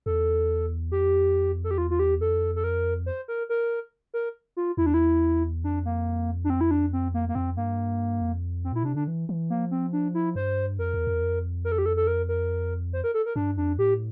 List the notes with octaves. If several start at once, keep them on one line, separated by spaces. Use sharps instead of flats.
E2 A4
F2 G4
A4
G4
E2 F4
F4
G4
F2 A4
A4
A#4
C5
A#4
A#4
A#4
F4
E2 E4
D4
E4
F2 D4
A#3
D4
C4
E4
D4
C4
A#3
A#3
F2 C4
G2 A#3
F2
C4
A#2 E4
C3 D4
D3 D4
E3
E3
F3 A#3
C4
D4
E4
G2 C5
F2 A#4
E2
F2
E2
F2
A#4
A4
G4
A4
A4
A#4
A#4
C5
A#4
A4
A#4
G2 D4
F2 D4
A2 G4